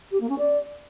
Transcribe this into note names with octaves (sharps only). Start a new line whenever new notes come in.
G4
A#3
C#4
D5